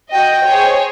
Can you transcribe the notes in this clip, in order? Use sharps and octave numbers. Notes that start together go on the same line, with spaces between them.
F#4 D#5 G5
G#4 C5 C#5